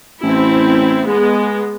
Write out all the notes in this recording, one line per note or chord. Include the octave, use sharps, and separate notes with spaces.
A1 C4 E4
G#3 B3